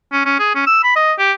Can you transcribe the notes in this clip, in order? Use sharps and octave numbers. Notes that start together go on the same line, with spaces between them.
C#4
C#4
G#4
C#4
E6
B5
D#5
G4